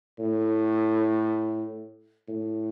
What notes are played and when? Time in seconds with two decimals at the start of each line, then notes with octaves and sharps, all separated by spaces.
0.19 A2
2.28 A2